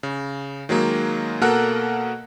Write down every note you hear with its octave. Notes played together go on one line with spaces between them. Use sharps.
C#3
D#3 F#3 G#3 A#3
B2 A#3 A4 A#4 F#5 F#6